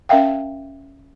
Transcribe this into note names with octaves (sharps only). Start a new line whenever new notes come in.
C#4 A#4 E5 F5 G5